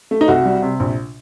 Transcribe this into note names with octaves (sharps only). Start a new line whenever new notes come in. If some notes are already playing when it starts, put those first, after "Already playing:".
A3
D#4
C2 F#4
G3
C3
A#1